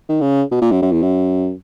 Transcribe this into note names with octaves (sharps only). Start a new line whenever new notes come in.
D#3
C#3
B2
A#2
F#2
F#2
E2
F#2